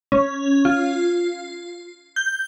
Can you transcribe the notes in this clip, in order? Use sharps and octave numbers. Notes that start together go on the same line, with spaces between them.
C#4
F4
G6